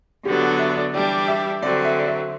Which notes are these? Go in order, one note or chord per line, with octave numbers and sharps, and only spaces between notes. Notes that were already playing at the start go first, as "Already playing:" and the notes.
D3 F#3 B3 D4 G4
F#5
E5
D5
E3 G3 D4 G4 D5
E5
D3 F#3 C4 D5
E5
D5
E5